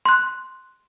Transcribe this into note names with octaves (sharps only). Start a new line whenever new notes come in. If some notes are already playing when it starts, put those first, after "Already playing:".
C6 F#6